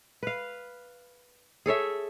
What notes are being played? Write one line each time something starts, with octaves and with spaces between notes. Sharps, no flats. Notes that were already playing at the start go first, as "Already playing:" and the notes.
B4 F5
G#4 A4 C#5 E5